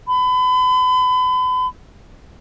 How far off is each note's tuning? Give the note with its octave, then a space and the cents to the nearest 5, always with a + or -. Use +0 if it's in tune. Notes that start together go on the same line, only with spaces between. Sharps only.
B5 +35